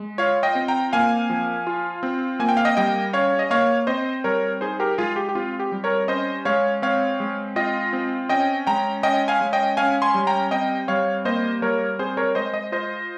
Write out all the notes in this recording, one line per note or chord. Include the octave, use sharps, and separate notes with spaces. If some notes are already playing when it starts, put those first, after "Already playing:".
Already playing: G#3
F4 C#5 F5
D#5 G5
C4
G5 A#5
A#3 F5 G#5
F3
F4
C4
A#3 G#5
G5
F5
D#5 G5
G3 D#5 G5
C#4 C#5 F5
D#5
A#3 C#5 F5
C4 C5 D#5
G3 A#4 C#5
D#4 G#4 C5
G4 A#4
G#3 F4 G#4
G4
G4
C4 F4
G4
G3
A#4 C#5
C#4 C5 D#5
G#3 C#5 F5
C4 C#5 F5
G#3
F4 D#5 G5
C4
C#4 D#5 G5
G#3 G5 A#5
C#4 D#5 G5
F5 G#5
G#3
D#5 G5
C#4 F5 G#5
G#5 C6
G3
G5 A#5
C4 D#5 G5
G3 C#5 F5
A#3 C5 D#5
G3 A#4 C#5
C4 G#4 C5
A#4 C#5
G#3 C5 D#5
C5 D#5
F4 C5 D#5